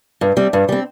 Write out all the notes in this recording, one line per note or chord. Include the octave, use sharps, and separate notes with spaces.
G2
G3 C4
G2
G3 C4